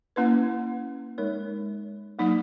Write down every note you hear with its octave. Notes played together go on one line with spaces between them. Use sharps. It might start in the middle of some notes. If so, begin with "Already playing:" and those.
A#3 C#4 E4 B4
G#3 D#4 A#4 C#5
F#3 A#3 D#4